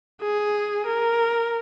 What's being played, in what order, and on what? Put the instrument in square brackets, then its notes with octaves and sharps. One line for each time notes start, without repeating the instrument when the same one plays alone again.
[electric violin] G#4
A#4